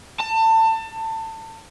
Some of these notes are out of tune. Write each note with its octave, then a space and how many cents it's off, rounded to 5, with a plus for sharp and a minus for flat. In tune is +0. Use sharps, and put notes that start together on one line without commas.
A5 +25